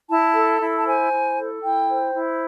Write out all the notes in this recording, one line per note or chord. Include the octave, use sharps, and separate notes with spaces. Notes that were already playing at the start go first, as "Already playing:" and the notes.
E4 A5
A4
E4
A5
C5 G#5
E4
A4
E4 G5
C5
E4